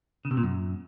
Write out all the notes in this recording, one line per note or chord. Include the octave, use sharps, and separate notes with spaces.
C#3
C3
A#2
F#2